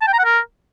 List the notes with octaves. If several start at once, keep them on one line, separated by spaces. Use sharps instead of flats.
A5
G5
A#5
F#5
A#4